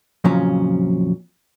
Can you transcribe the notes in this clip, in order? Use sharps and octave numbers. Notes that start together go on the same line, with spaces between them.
F2 A#2 C#3 F3 F#3 C#4